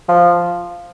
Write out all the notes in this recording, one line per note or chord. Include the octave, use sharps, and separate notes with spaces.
F3